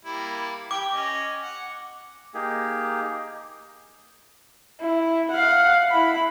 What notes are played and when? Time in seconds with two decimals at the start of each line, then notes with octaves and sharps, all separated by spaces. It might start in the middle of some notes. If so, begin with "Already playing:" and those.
0.05 G3 A#3 E4
0.71 G4 G5 D6
0.93 C#4 D#5
1.42 F#5
2.34 A#3 D#4 G4 G#4
4.80 E4
5.31 F5 F#5
5.90 E4 B5